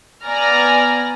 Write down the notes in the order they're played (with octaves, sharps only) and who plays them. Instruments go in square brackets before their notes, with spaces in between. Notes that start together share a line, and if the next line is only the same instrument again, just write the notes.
[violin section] B3 D5 G#5 A#5 F6